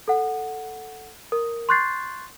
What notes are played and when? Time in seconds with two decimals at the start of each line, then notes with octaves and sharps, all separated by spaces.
0.08 A4 F#5
1.32 A#4
1.69 C6 C#6 F#6 G6 A6 C7